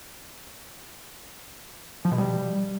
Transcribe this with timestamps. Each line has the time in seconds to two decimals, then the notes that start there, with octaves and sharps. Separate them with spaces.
2.05 F3
2.11 B2
2.18 G3